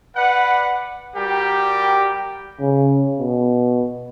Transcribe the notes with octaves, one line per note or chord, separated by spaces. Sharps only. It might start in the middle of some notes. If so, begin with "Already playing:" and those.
B4 D5 F#5
G3 F#4 G4 A#4 G5
C#3
B2